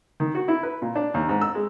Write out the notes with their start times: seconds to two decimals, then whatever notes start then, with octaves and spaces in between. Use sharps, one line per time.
0.20 D#3
0.35 F#4
0.48 E4
0.63 B4
0.82 A#2
0.96 D4
1.14 D#2
1.29 G#2
1.41 E6
1.55 G#3